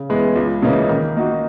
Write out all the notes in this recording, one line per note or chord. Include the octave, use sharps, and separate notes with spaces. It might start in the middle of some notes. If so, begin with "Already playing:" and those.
Already playing: C#3
E3 G#3 B3
C#2
C#3 E3 A#3 D#4
D#3
A#3 D#4 F#4